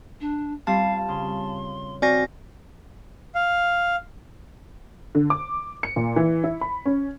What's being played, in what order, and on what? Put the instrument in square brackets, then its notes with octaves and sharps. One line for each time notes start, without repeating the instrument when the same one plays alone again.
[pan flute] D4
[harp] G3 C4 F4 [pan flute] F5 [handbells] A5
[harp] C#3 [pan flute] C6
[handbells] C4 F#4 A#6 [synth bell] D5 G#5
[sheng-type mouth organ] F5
[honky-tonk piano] D3
D6
C#7
A#2
E3
E4
B5
C#4